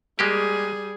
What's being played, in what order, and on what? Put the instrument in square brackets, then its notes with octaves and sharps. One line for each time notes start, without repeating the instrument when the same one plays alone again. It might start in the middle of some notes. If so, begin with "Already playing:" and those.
[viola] G3 G#4 [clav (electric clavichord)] G#3 A#3 G4